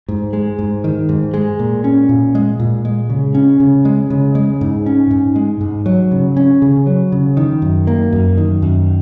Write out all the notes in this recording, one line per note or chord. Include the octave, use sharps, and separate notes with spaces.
G#2
G#3
G#2
D#3
G#2
G#3
A#2
C#4
A#2
G#3
A#2
G#3
C#3
C#4
C#3
G#3
C#3
G#3
G#2
C#4
G#2
G#3
G#2
F#3
C#3
C#4
C#3
F#3
C#3
D#3
F#2
A#3
F#2
D#3
F#2